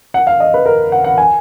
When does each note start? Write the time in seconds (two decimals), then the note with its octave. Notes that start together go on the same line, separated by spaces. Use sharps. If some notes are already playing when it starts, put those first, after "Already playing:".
0.14 F#5
0.27 F5
0.40 D#5
0.54 B4
0.66 A#4
0.92 F#5
1.04 F#5
1.18 G#5